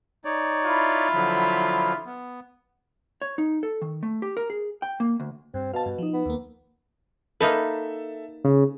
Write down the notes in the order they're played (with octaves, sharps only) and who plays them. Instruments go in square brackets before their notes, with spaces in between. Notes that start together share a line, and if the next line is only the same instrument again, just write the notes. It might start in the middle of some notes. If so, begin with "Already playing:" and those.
[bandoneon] D#4 C#5 D5
[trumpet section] E4 F4 B5
[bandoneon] D3 F3 F#3
B3
[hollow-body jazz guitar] C#5
D#4
A4
D#3
A3
G4
A#4
G#4
G5
A#3
D2
[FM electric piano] G2 [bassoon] C4
[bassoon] B2 [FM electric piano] F5 A5
[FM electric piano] G2
F3 D#4
[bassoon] B3
[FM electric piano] D#2 A#3
[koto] A#3 D#4 B4 [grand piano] A4 E5
[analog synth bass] C#3